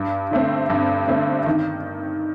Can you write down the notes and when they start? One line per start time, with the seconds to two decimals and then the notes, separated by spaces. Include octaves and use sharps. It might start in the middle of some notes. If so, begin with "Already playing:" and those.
Already playing: G2
0.31 D3 A3 C4
0.70 G2
1.08 D3 A3 C4
1.46 D#3